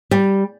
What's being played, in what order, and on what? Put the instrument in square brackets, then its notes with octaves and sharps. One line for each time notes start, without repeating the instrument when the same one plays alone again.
[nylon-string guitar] G3